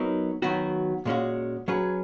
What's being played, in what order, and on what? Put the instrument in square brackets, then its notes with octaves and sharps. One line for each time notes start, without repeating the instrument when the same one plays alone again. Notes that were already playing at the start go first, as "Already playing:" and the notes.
Already playing: [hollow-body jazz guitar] F#3 B3 D#4 A#4
D#3 F#3 B3 F#4
A#2 G#3 C#4 F#4
F#3 C#4 G#4 B4